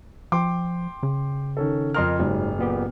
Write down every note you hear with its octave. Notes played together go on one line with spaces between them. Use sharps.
F3 G5 C6 D6
C#3
D#3 C#4 A4
F2 A#4 D#5 C6 F6
F#1 G#2 F#3 G3
A#2 B3 G4